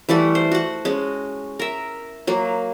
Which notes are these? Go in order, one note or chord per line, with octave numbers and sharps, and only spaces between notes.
E3 G3 A3 F#5
C5
F#4 F#5
G#3 C#4
A#4 E5
F#3 A#3